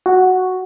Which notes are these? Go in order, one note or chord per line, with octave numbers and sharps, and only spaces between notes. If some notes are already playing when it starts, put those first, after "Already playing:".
F#4